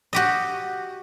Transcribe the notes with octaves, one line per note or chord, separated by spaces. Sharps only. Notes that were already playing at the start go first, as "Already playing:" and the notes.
F#4 G4 D#5